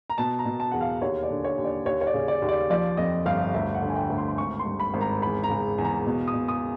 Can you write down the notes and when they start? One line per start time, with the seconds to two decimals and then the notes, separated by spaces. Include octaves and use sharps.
0.10 A#5
0.18 B2 A5
0.39 A#5
0.45 B2
0.60 A5
0.71 E2 F#5
0.81 F5
1.01 D#2 C#5
1.23 D5
1.30 D3
1.44 C#5
1.58 D#2
1.64 D5
1.86 D#2 C#5
2.01 C#5
2.07 D5
2.14 C#3
2.28 D5
2.42 D#2
2.49 D5
2.70 F3 D5
2.97 F2 D#5
3.26 G1 F5
3.54 D2 E5
3.75 F#5
3.82 D3
3.89 G#5
3.96 G5
4.10 D2
4.18 C6
4.28 C6
4.38 G#1 C#6
4.59 C6
4.66 G2
4.80 B5
4.94 G#1
5.01 A#5
5.22 E2 B5
5.44 A#5
5.50 C#3
5.78 E2
5.84 A#5
6.07 B2
6.27 D#6
6.34 B2
6.48 D#6